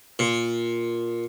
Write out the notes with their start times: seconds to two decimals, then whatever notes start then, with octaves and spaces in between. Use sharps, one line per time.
0.19 A#2